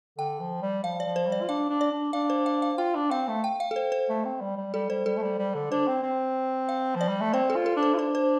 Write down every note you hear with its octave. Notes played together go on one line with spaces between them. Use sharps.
D3 G5
F3
G3
F3 F5
D5
F3
C5
G3
D5
F4
D4 F5
D4
D5
D4
D4 F5
C5
F5
F5
F4 G5
D4
C4 F5
A3
G5
F5
A4
C5
C5
A3
C4
G3
G3
G3 A4
G3 C5
G3 A4
A3
G3
G3
D3
D4 C5
C4
C4
F5
F3
D5
G3
A3
C4 C5
A4
F4
A4
D4
C5
F4
D4 C5
C5